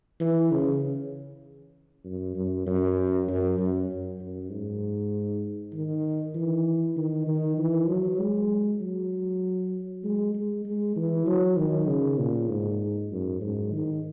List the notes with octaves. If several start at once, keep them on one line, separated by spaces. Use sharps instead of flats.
E3
C#3
F#2
F#2
F#2
F#2
F#2
F#2
G#2
D#3
E3
D#3
D#3
E3
F#3
G#3
F#3
G#3
G#3
G#3
E3
F#3
D#3
C#3
A#2
G#2
F#2
G#2
D#3